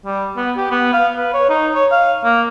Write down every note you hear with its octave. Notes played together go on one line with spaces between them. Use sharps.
G3
B3
G4
B3
F5
B4
C#5
D#4
C#5
F5
A#3